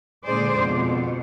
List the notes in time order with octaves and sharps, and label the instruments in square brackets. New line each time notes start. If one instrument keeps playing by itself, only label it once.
[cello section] A#2 D3 G#3 G#4 C5 D5
F2 B2